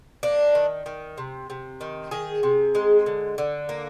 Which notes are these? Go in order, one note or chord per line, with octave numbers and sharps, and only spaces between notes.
A#3 D4
D#3
D#3
C3
C3
D#3
D#3 G#4
C3
G#3
D3
D3
A#3